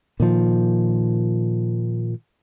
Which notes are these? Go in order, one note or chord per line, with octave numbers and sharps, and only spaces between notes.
A#2 D#3 F3